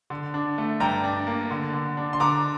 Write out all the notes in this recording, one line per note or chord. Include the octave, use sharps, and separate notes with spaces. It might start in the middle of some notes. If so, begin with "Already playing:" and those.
D3
D4
A3
G2 G5 A#5
D4
A#3
D3
D3
D4
C6
D3 A#5 D6